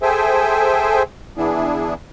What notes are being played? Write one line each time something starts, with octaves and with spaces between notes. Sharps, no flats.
G#4 A4 C5 E5 G5 G#5
E3 B3 D4 E4 G#4